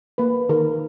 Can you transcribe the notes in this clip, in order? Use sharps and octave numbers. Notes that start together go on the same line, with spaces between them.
A#3 B4
D#3 A#4